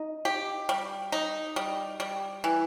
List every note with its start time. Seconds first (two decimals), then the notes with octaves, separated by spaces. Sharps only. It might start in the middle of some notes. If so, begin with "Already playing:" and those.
Already playing: D#4
0.25 G4
0.69 G3
1.12 D#4
1.56 G3
2.00 G3
2.44 E3